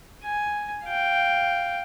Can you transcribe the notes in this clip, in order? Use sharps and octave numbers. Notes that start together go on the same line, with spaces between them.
G#5
F5 G5